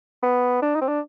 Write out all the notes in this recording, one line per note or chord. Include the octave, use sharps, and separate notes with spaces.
B3
D4
D#4
C4
D4